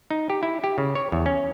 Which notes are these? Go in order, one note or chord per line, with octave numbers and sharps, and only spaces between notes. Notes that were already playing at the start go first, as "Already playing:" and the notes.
D#4
G4
E4
G4
C#3
C#5
E2
C#4